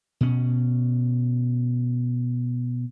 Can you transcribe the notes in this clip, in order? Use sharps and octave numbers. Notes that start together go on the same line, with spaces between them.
B2 C#4